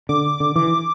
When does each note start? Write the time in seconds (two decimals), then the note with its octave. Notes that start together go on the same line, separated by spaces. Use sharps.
0.09 D3 D6
0.40 D3
0.56 E3 D6